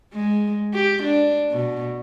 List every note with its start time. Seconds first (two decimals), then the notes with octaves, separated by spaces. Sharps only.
0.13 G#3
0.74 G4
1.03 D4
1.51 B2